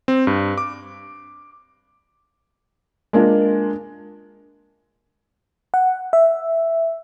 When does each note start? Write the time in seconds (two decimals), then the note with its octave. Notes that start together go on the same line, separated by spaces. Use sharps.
0.08 C4
0.27 G2
0.58 D6
3.13 G#3 A#3 D4 F4 A#4
5.74 F#5
6.13 E5